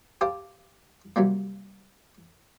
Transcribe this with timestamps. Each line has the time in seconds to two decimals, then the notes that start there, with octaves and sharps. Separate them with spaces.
0.21 G4 A4 C5 F5 G5
1.16 C3 F#3 G3 A#3